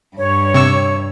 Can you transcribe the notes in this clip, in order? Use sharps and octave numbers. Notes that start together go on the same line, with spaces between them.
G2 C#5
C3 C#6 E6